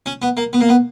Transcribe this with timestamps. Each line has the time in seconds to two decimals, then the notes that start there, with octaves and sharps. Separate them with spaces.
0.06 C#4
0.22 B3
0.37 A#3
0.53 B3
0.61 A#3
0.69 B3